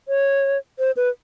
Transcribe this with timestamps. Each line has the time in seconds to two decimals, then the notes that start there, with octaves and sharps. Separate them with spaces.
0.08 C#5
0.79 C5
0.97 B4